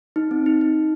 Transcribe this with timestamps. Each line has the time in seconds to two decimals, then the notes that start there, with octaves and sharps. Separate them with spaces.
0.16 D#4
0.31 C4
0.46 D#4
0.61 D#4